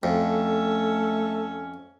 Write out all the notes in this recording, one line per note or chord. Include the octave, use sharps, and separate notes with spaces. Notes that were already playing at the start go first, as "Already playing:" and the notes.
F2 A3 C#4 A4